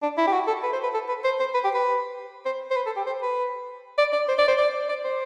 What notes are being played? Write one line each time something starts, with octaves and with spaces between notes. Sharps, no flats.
D4
E4
G4
F#4
A4
B4
C5
B4
A4
B4
C5
C5
B4
G4
B4
C5
C5
B4
A4
G4
C5
B4
D5
D5
C5
D5
C5
D5
D5
C5